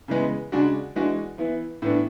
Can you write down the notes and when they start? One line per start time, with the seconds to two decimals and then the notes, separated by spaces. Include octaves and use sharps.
0.08 C#3 E3 G#3 B3
0.52 C#3 G#3 D4 F#4
0.96 E3 G#3 D4 F#4
1.38 E3 B3 E4
1.82 A2 E3 B3 D4